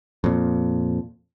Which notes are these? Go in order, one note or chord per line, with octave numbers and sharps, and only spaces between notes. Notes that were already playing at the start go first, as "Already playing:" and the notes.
F2 A#2